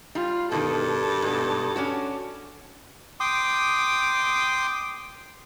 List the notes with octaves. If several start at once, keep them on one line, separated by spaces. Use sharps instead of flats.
G3 F4
G2 B2 D#3 A4
G#2 B2
C#4 D4 F#4
G5 C6 D6 D#6